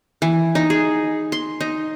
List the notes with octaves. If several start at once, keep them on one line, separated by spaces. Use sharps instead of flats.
E3
D#4
G#4
C6
D#4